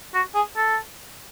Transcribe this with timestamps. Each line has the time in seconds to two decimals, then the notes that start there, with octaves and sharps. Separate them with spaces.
0.14 F#4
0.35 G#4
0.57 A4